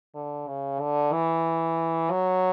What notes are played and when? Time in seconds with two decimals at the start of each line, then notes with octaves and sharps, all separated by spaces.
0.15 D3
0.48 C#3
0.80 D3
1.13 E3
2.11 F#3